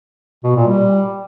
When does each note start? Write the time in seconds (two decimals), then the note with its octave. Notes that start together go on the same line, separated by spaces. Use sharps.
0.44 B2
0.56 A#2
0.67 G3